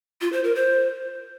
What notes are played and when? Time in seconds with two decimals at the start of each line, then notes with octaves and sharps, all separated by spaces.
0.21 F4
0.33 C5
0.44 A#4
0.55 C5